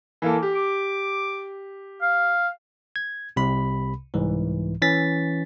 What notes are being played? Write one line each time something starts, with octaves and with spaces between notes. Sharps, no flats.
E3 A#3 A4
G4
D6
F5
G#6
C2 C3 B5
C2 G#2 E3
E3 C#4 A6 B6